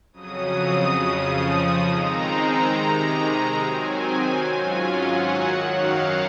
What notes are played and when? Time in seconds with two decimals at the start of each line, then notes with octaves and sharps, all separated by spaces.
0.13 F2 C#3 F#3 D#6
0.99 F2 C#3 F3
1.85 D#3 G#3 C4 D#4 A#5
2.29 A#5
2.72 C3 D#3 G#3
3.58 D#3 F#3 C4 G#5
4.44 G#2 F#3 C#4 F4
4.88 F#5
5.31 F#2 D#3 F#3
5.74 F5